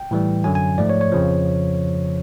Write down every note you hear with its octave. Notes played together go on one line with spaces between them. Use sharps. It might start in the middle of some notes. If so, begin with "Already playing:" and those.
Already playing: G5
A2 E3 G3
F#2 D3 F#3 G#5
G#5
G#2 F3 A3 D5
C#5
C#5
F2 C#3 F3